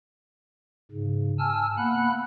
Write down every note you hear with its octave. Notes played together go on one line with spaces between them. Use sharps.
G#2 C#3
G#5 A5 E6 F6
A#3 B3 F#5 B5 F#6